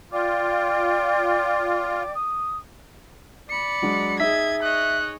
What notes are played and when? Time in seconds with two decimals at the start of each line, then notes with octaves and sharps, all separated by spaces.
0.12 F4 D5 G5 D6
2.14 D#6
3.50 D5 B5 C#7
3.82 F#3 G#3 D4
4.20 D#4 G#4 D#5 E5 G#6 B6
4.63 C#5 D#5 F#6